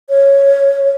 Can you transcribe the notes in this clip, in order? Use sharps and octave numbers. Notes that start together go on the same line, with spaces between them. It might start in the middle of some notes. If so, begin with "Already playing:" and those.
C#5